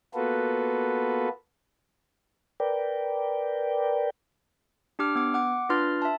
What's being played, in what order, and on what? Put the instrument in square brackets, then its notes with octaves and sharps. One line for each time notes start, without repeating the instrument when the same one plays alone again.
[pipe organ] A#3 B3 F4 F#4 A4 B4
[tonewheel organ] A#4 B4 D5 G5
[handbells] D4 G4 D6 F6
B3 D6
F#5 D6
D4 F4 B4 C6 F6 A6
E5 A5